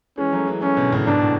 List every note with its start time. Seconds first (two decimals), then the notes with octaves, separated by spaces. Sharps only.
0.17 E3 G#3 C#4
0.33 F#3 A3
0.47 E3 G#3
0.62 F#3 A3 C#4
0.77 B2 D3
0.92 A2 C#3
1.06 G#2 B2 D4
1.21 A2